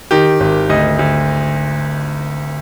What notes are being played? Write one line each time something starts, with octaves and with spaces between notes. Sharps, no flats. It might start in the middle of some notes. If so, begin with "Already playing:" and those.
D#3 G4
G#1
D2 D#5
D2